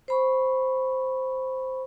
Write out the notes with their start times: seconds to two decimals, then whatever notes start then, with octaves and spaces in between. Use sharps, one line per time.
0.08 C5 B5 C#6